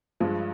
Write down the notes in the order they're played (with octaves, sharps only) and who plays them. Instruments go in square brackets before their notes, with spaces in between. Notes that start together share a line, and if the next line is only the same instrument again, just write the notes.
[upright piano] G2 F3 G#3